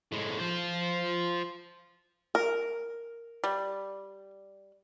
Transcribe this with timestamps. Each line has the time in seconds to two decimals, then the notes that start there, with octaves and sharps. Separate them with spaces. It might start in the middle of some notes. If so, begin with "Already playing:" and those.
0.12 A2 G#3
0.39 F4 C5
2.35 A#4
3.44 G3